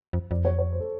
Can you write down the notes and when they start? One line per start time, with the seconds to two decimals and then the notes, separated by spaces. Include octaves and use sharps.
0.13 F2
0.31 F2 D5
0.45 C#5
0.59 C#5
0.73 C5
0.80 A4